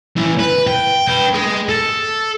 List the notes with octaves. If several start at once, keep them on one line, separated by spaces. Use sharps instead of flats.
A2 E3
B4
G5
B4 G5
G#4 C6
A4